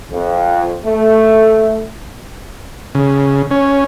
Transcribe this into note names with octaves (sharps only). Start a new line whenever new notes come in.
F2
A3
C#3
C#4